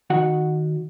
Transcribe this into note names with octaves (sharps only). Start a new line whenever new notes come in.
D#3 F#4 F#5